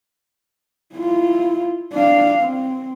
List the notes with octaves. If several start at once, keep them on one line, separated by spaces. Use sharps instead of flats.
E4 F4
D4 F5
C4